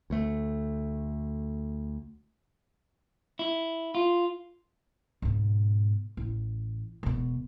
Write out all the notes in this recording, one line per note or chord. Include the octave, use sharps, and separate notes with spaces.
D2 A3
E4
F4
G#2 B2
A1
E1 B2